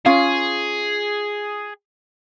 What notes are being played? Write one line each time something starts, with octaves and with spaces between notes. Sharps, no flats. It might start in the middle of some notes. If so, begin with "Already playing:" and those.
C#4 F4 G#4 F5